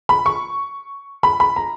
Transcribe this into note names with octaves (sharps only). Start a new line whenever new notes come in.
B5
C#6
B5
B5
A#5